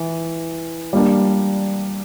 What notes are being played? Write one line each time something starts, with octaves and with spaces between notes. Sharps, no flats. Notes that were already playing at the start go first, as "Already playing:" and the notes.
Already playing: E3
G3 A#3 D4